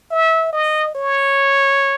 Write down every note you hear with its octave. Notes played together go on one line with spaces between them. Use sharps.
E5
D#5
C#5